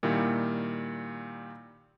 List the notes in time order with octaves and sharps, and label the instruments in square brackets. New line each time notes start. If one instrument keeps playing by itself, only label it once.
[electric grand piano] A#2 D#3 G3 E4